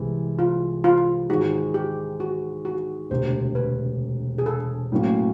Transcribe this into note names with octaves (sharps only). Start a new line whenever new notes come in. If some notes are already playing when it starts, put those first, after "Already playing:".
Already playing: C2 C3 E3 G#3
F4
F4
G#2 D#3 G#3 F#4
G4
F#4
F#4
E1 D2 C3 C5
B4
G#4
A4
A2 F#3 A#3 C#4